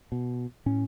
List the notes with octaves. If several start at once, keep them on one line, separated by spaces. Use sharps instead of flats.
B2
A2 C#4